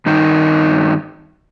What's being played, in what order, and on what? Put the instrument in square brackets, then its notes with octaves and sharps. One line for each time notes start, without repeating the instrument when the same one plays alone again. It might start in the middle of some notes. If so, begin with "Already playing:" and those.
[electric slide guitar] G2 D#3 D#4